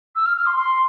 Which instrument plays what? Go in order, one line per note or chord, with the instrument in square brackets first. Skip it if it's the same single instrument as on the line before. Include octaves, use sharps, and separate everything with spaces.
[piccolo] E6
F6
F6
C6
C6